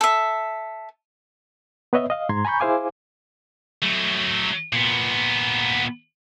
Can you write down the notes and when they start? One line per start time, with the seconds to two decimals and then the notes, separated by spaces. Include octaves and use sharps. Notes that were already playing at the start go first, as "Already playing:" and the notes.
0.01 A4 E5
1.93 B3 B4 C#5 D#5 E5
2.10 D#5 F5
2.29 G#2 A#5 C6 G#6
2.45 G#5 A#5 B5 C#6 G6
2.60 E4 G#4 C5 F5 G#5 D6
3.83 F#3 A3
4.73 A#2 B3